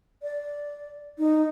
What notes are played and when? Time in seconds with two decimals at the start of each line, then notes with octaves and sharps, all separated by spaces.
0.23 D5
1.18 D#4